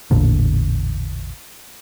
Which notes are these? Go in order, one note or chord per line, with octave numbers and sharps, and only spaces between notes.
A1 E2 A#2 D3